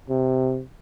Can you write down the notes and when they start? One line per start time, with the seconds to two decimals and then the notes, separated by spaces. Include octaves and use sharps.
0.09 C3